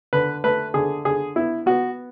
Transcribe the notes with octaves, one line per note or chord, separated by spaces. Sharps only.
D3 B4
A3 B4
D3 G#4
D3 G#4
B3 E4
B3 F#4